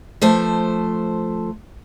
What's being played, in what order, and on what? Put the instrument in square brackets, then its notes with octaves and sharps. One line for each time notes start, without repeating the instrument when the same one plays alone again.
[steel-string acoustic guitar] F3 A3 C5